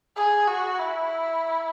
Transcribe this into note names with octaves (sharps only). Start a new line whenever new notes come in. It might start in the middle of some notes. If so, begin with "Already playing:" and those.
G#4
F#4
E4